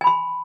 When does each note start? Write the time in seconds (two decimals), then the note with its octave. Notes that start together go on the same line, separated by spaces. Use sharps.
0.01 G#5
0.04 B5
0.07 C6